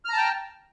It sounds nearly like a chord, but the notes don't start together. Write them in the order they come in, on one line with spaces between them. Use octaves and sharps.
F6 A#5 A5 G5